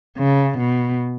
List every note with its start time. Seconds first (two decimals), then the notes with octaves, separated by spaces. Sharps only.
0.18 C#3
0.59 B2